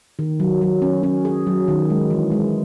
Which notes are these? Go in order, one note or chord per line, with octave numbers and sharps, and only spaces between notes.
D#3
F#3
F#3
C#4
C#4
G#4
F#3
D#3
G#3
E3
G#3